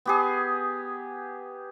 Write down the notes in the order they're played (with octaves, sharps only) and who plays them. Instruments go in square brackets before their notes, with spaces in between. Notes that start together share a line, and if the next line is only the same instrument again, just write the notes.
[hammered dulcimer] B3 G4 G#4